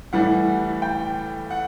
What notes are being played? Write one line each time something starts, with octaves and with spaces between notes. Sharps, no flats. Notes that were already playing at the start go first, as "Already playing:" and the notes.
A2 E3 G3 F#5
G5
F#5